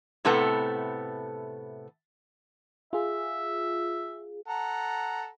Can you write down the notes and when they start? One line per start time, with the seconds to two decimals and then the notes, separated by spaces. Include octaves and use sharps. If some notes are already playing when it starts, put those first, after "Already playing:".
0.25 A2 C3 A3 B3 A4
2.93 F4 G#4 E5
4.48 A4 F#5 A#5